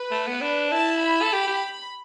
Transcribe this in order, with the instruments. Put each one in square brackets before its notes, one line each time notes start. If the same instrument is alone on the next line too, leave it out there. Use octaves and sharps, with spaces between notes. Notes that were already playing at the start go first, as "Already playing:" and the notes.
Already playing: [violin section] B4
[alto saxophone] A3
B3
D4
[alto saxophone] E4 [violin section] A5
[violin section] B5
[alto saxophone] A4
G4
G4